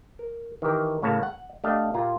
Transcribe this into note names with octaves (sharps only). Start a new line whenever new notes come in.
A#4
D#3 E3 G4 A#4
A2 C#3 A#3 C#5 A5
F#5
A3 D4 G4 D#5 F5
A#2 F4 G4 A#5